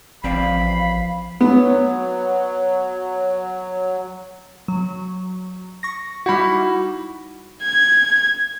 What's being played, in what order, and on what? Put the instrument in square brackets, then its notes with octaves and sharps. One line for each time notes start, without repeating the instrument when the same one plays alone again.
[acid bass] A1 [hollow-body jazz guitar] F3 C4 D5 [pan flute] F5 [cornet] B5
[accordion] F#3 [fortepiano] B3
[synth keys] F#3
C#6 A#6
[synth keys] G3 D#4 E4 [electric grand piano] F#4 B5
[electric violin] G#6